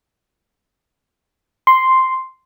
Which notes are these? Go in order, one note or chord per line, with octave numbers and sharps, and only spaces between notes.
C6